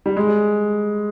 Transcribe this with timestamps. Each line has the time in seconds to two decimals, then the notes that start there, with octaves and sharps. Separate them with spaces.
0.06 G3
0.17 G#3